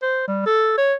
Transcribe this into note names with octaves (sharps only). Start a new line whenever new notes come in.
C5
G3
A4
C#5